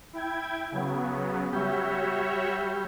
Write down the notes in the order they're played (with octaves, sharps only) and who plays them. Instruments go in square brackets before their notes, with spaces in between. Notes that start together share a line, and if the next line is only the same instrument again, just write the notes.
[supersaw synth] E4 G5 G#6
C#3 F#3 B3
[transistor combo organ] G3 [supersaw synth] F#4 C#5 E5